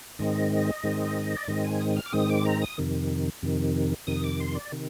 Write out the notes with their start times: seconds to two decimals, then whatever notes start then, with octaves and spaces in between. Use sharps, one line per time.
0.19 G#2 D#3 G#3 C4 D#5
0.83 G#2 D#3 G#3 C4
1.37 D5
1.48 G#2 D#3 G#3 C4 D#5
1.64 G#5
1.80 D#6
1.96 F6
2.06 D6
2.12 G#2 D#3 G#3 C4 D#6
2.30 D6
2.45 A#5
2.62 D#6
2.78 F2 C3 D#3
3.42 F2 C3 D#3
4.07 F2 C3 D#3 D#6
4.24 D6
4.40 C6
4.55 D5
4.72 C3 D#3